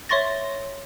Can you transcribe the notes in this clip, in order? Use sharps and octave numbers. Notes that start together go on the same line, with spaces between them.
C#5 E5 C6 C#6 A6 A#6